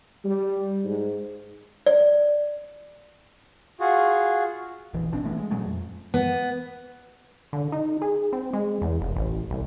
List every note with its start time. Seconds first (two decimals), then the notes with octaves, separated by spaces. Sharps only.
0.25 G3
0.84 G#2
1.86 D5
3.80 F4 F#4 G#4
4.94 D#1 A#1 E3
5.12 G#1 B2 C4 D4
5.24 E3 A3 B3
5.38 G#3
5.51 A#2 F#3 G#3 A3
5.65 F2
6.14 B3
7.53 D3
7.72 D#4
8.02 G#4
8.33 C4
8.53 G#3
8.82 E2
9.01 F1
9.16 A1
9.50 C2